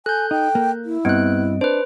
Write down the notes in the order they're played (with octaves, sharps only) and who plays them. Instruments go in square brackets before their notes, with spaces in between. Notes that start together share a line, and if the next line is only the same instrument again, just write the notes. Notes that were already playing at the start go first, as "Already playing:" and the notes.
[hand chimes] A4 [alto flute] G#5 [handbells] F#6 G6
[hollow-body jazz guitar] D#4 [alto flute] G5
[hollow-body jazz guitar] A#3
[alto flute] E4
[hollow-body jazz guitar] G2 [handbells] B3 F#6 [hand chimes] C4 D#5 D7
[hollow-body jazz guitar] D4 [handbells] B4 C5